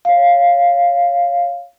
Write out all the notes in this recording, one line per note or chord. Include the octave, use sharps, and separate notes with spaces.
C#5 F5